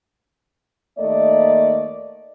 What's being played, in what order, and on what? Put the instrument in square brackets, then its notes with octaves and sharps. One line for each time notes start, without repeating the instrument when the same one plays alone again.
[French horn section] D#2 A3 A#3 D5 D#5